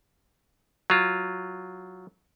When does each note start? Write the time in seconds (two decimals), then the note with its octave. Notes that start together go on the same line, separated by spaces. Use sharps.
0.90 F#3 F4